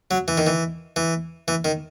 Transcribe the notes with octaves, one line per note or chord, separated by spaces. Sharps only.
F#3
E3
D#3
E3
E3
E3
D#3